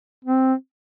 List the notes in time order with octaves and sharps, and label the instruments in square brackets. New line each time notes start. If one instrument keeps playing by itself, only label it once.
[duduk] C4